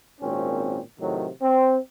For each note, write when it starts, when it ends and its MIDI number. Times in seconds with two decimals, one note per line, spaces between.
0.21 0.80 32
0.21 0.80 46
0.21 0.80 60
0.21 0.80 61
1.00 1.29 45
1.00 1.29 48
1.00 1.29 51
1.00 1.29 54
1.42 1.78 60